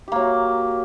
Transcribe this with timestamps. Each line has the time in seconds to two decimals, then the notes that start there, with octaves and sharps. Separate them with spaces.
0.08 G4
0.12 A#3
0.16 F#3